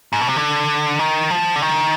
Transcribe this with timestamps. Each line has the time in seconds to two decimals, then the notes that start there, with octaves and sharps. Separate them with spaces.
0.13 G#2
0.21 B2
0.28 C3
0.36 D3
0.99 D#3
1.30 F3
1.55 D3
1.62 D#3